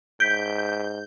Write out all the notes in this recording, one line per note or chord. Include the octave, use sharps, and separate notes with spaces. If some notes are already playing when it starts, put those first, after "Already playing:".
G#2 G6 B6 D7